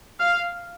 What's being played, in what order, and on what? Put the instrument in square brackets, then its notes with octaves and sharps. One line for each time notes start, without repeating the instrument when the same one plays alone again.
[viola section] F5